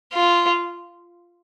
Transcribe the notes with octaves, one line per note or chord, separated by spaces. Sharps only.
F4